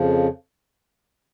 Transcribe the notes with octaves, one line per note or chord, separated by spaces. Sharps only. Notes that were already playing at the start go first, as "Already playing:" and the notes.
Already playing: F2 C#3 F3